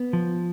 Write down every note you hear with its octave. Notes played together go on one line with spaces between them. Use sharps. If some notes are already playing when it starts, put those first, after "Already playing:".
Already playing: B3
F3